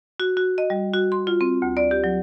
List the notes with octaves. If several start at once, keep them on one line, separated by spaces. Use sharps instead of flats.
F#4
F#4
D#5
G3
F#4
C6
F4
C4
D2
D5
G4
F#3